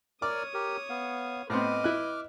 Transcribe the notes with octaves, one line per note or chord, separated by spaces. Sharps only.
A#4 C#5 D5 D6 D#6 F6
G4 A#4
B3 F5
A2 B3 C4 B4 D#5 D6 F6
E4 F#6